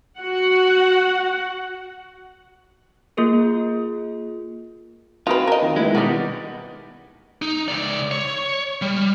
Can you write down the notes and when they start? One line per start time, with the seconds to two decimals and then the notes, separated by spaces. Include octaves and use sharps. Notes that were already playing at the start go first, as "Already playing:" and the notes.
0.18 F#4 F#5
3.17 A#3 F4 G#4 A#4
5.27 C4 D#4 F4 F#4 B4
5.47 A#4 D#5
5.62 D#3
5.76 G#3 B3 D#4 E4
5.95 B2 D#3 G3 F#4 D5
7.42 D#4
7.68 C#2 D5
8.11 C#5
8.82 G3